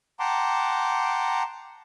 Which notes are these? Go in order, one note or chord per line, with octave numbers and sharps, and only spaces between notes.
F#5 G5 A5 A#5 C6 D6